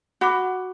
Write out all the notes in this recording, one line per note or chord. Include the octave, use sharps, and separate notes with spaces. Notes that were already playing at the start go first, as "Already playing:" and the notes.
F#4 F#5 B5 D6